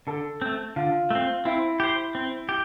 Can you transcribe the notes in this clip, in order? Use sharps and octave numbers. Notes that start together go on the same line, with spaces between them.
D3 A4
A3 C4
D3 F4
A3 C4
C4 E4
G4 C5
C4
G4